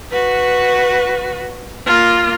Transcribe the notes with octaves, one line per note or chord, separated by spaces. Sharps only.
F#4 B4
A#3 F4